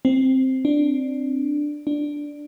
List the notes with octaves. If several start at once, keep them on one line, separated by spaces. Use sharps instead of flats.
C4
D4
D4